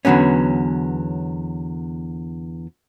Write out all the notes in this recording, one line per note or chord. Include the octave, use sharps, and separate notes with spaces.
E2 D3 F#3 B3 C#4